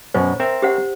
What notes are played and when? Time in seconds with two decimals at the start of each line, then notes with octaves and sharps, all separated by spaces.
0.14 F#2 B2 C#4 C5
0.40 C4 A#4 E5
0.62 G4 C5 F#5